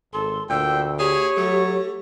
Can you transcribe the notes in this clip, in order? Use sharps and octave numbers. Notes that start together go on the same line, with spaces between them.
G#1 A4 C6
D2 A#2 G5 E6
G4 G#4 C#5
F#3 A3